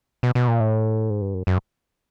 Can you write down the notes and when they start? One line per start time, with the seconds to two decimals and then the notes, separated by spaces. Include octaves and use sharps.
0.23 B2
0.35 B2
0.48 A#2
0.60 A2
1.10 G#2
1.21 G2
1.34 F#2
1.47 F#2